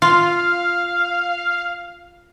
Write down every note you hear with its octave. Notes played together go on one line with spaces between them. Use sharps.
F4 F5